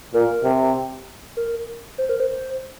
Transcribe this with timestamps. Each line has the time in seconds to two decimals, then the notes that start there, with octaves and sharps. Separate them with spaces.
0.14 A#2 A#4
0.44 C3
1.37 A#4
1.98 C5
2.09 A#4
2.20 C5